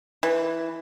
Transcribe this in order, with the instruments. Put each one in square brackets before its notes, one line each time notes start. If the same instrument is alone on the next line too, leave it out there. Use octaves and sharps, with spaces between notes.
[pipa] E3